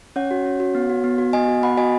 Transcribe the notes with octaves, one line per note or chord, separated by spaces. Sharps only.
C#4 C#5 F#5
F#4
C#4
F#4
B3
F#4
B3
F#4
B3 D#5 G#5
F#4
B3 F#5 B5
F#4 D#5 G#5